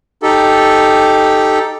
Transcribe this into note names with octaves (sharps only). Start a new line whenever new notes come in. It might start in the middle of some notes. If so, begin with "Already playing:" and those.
D#4 G4 A4